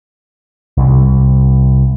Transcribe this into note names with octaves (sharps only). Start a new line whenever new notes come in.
C2